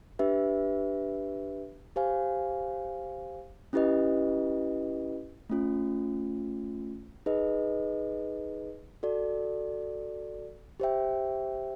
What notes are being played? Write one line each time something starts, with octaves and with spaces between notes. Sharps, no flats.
D4 G4 B4 E5
G4 C5 F5 G#5
C#4 E4 G4 B4 D#5
A3 C#4 F4
D#4 G#4 B4 D#5
F#4 A4 D5
G4 C5 E5 G5